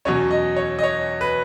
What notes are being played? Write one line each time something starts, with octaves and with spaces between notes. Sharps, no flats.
E2 B2 F#3 C#4 C#5
D#5
C#5
D#5
C#5
B4